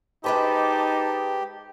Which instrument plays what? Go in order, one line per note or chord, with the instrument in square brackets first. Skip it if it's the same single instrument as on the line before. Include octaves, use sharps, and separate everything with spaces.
[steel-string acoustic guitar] G#3 B4 C5 [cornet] D#4 [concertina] G4 [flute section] D#5 A5 D6